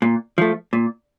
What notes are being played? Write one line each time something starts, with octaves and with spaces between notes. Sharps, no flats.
A#2
F3 A3
A#2